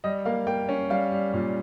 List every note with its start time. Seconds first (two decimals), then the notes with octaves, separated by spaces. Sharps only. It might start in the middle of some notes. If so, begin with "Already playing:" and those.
0.04 G3 D#5
0.25 A#3 F5
0.47 A#3 G5
0.69 C#4
0.90 G3 F5
1.12 G3
1.34 A#2